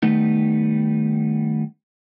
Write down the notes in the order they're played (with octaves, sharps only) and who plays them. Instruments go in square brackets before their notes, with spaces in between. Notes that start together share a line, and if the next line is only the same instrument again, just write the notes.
[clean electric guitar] D#3 G3 A3 B3 D#4